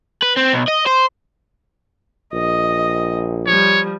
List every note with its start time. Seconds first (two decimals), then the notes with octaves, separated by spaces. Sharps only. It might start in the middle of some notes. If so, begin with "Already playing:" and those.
0.23 B4
0.37 C4
0.54 B1
0.68 D#5
0.87 C5
2.34 A#1 D#5
3.47 F3 G3 C#5